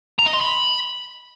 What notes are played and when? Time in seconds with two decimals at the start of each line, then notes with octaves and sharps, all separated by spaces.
0.19 A#5
0.26 D#5
0.34 C6
0.41 B5